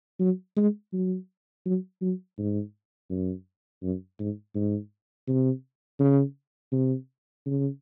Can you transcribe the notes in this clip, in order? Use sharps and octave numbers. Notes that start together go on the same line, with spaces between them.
F#3
G#3
F#3
F#3
F#3
G#2
F#2
F#2
G#2
G#2
C3
C#3
C3
C#3